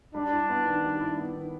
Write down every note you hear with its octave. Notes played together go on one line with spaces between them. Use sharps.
G3 D4
E4
B3
D#3
G3
E4
B3
D#3